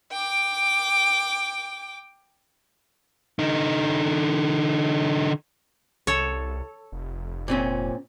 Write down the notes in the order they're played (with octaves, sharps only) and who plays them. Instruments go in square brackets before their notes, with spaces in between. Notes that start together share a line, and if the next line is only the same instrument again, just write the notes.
[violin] G5 D6
[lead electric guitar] D3 D#4
[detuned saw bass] C2 [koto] A4 C#5
[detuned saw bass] F1
[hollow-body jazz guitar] A#2 C4 C#4